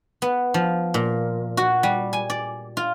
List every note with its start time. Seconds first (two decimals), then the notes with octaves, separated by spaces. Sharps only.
0.22 B3
0.54 F3
0.94 A#2
1.57 F#4
1.83 G3
2.13 G#5
2.30 D5
2.77 F4